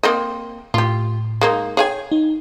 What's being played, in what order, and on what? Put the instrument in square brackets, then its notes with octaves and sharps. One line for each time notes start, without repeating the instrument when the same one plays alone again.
[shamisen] A#3 C4 D#5
[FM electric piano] A2 [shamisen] F4 G4
[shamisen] G#3 A#3 D#4
[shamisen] G#4 F5 G#5 [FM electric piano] C#5 G5
[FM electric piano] D#4